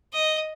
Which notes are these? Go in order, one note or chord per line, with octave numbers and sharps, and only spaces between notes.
D#5